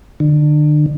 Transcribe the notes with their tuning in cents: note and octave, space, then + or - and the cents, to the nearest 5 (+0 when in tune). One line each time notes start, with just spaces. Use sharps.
D3 +35